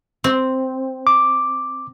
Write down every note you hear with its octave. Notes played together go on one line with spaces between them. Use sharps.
C4
D6